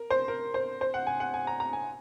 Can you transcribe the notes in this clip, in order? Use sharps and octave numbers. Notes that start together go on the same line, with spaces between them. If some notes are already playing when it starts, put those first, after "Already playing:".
Already playing: A#4
C5
A#4
C5
C5
F#5
G#5
F#5
G#5
A#5
A#5
G#5